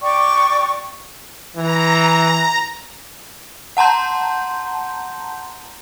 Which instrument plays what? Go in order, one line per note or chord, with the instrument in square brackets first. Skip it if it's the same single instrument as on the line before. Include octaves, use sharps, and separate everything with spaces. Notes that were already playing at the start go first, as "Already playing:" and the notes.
[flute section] D5 G5 C#6 D6
[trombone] E3 [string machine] A#5
[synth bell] F#5 A5 A#5 C6 G6